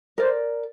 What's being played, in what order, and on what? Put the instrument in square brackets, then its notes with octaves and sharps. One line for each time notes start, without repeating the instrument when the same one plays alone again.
[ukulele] A#4 D5 [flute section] C5